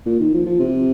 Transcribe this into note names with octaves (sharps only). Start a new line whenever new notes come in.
A#2
D#3
F3
F3
C3